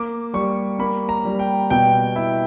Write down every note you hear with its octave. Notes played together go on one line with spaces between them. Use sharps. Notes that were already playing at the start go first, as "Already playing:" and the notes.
Already playing: A#3 D6
G3 C#6
A#3 B5
A#5
G3
G5
B2 G5
E4